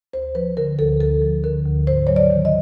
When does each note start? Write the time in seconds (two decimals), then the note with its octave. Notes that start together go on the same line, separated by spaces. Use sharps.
0.13 D2 C5
0.35 F3 B4
0.57 D3 A#4
0.78 D2 A4
1.00 D2 A4
1.22 F3
1.44 D3 A#4
1.65 D2
1.87 G#2 C5
2.07 F#3 C#5
2.16 D5
2.30 D#3
2.45 D#5